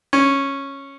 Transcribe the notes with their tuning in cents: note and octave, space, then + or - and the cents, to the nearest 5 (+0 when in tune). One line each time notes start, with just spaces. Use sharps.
C#4 -10